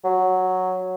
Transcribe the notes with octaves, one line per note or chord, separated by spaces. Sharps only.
F#3